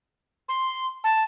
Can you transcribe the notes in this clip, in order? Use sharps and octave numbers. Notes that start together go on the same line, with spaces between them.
C6
A5